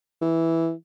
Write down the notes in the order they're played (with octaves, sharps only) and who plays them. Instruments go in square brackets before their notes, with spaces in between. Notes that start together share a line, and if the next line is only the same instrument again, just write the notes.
[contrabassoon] E3